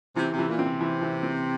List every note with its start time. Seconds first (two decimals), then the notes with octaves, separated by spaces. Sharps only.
0.16 C3 E3
0.33 C3
0.39 E3
0.49 A#2
0.59 C4
0.65 C3
0.81 E3
1.02 E3
1.23 C4